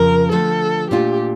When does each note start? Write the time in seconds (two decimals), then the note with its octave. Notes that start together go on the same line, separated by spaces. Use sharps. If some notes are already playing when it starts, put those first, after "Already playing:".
Already playing: F2 C#3 F3 A#4
0.31 D3 F3 A3 A4
0.90 A#2 A3 D4 F4 G4